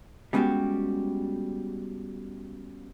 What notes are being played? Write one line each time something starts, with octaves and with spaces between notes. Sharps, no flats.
G3 G#3 B3 C#4 F#4 G4